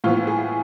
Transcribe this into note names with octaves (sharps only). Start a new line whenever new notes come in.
A2 E3 B3 F4
G#4